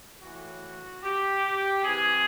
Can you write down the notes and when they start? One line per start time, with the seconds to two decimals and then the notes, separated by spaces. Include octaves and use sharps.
0.21 A2 E3 F#4
1.03 G4
1.83 C3 E3 G#4